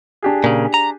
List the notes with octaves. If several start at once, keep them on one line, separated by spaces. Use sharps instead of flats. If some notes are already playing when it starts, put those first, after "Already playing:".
D4 G4 G#4
A#2 C#3
A#5